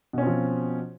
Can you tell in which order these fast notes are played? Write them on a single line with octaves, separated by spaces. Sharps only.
B2 C#4 C4 F3